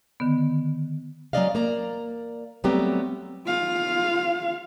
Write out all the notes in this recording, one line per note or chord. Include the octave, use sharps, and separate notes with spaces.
D3 D#3 B3
F#3 A3 C#4 D5 D#5 F5
A#3 D5 A#5
F#3 G3 A3 B3 C4 G4
F4 F5